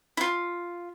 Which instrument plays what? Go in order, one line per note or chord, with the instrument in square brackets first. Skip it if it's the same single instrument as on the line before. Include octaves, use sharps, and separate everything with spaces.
[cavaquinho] E4 F4